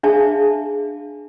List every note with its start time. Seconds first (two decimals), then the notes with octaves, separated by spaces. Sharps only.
0.03 D4 G#4 E5 F5 A5